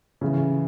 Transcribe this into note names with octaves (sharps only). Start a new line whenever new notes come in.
C#3 E3